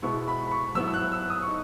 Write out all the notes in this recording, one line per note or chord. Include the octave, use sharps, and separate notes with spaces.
B2 G#3 B3 E4 C#6
B5
B5
C#6
F#3 B3 E4 E6
E6
F#6
E6
D#6
C#6
D#4